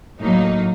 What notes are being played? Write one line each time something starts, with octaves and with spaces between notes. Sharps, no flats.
A2 F#3 A#3 D#4